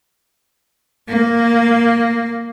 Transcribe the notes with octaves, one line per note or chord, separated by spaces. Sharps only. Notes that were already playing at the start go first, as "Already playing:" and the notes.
A#3